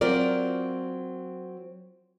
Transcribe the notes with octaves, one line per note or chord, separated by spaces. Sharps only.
F#3 C4 F4 A#4 D5